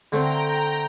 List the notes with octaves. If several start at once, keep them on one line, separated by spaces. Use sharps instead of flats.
D3 A3 C4 G5 A#5